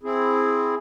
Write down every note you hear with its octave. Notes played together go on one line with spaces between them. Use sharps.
C4 E4 G#4